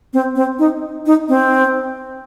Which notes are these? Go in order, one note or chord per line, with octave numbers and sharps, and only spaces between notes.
C4
C4
D#4
D#4
C4